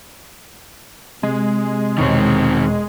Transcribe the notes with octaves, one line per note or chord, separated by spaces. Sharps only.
C3 G#3
E1 D#3 C4 C#5 C#6